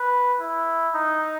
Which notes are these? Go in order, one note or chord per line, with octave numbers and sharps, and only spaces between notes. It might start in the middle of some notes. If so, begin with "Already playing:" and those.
Already playing: B4
E4
D#4